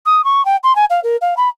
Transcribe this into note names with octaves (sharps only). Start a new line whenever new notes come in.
D#6
C#6
G5
C6
G#5
F5
A#4
F5
B5